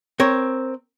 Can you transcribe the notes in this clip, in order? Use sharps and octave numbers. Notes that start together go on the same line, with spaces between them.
C4 A#4 C#5